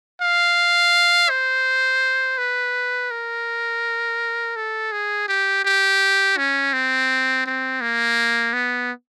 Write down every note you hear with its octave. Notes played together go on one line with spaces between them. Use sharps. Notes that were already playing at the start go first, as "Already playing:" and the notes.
F5
C5
B4
A#4
A4
G#4
G4
G4
C#4
C4
C4
A#3
B3